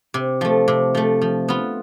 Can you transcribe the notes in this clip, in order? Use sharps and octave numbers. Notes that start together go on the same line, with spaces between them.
C3
F3 A3
C3
F3 A3
F3
B3 F4